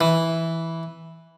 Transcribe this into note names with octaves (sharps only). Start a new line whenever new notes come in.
E3